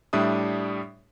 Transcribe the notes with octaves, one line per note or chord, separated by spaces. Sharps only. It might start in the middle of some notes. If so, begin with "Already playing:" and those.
A2 G3 D4 E5 D#6